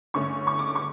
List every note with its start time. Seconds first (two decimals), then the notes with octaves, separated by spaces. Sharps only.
0.14 G2 D3 A3 C#4 C#6
0.47 C#6
0.59 D6
0.76 C#6